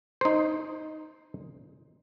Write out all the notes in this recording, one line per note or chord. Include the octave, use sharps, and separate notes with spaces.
D#4 C5